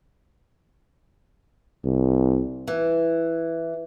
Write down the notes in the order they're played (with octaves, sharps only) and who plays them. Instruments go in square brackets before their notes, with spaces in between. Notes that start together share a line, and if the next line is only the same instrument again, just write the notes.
[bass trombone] C2
[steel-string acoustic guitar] E3